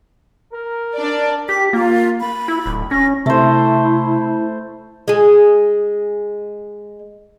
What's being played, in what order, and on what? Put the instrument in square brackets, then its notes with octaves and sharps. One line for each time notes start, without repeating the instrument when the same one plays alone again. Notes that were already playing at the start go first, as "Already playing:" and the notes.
[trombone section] A#4
[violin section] D4 D5
[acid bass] G4 [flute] B6
[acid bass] A#3 [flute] F4
[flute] B5
[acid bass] E4
D1
[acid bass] C#4 [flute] A#6
[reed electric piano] C3 [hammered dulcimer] A3 C5 [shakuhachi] E4
[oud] G#3 G#4